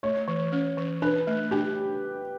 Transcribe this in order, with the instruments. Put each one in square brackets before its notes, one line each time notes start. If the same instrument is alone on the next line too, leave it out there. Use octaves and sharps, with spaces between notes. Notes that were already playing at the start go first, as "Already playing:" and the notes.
[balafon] A3 [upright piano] C#5
[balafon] E3
C#4
E3
[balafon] D4 [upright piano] B4
[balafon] A3
[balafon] D4 [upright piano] G4